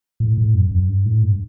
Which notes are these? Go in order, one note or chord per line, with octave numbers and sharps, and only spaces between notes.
A2
A2
F#2
F#2
G2
A2
G2